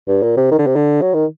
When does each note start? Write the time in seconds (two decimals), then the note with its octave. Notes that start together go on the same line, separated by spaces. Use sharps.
0.08 G2
0.22 A#2
0.37 C3
0.51 D#3
0.59 D3
0.67 C3
0.76 D3
1.02 F#3
1.14 D#3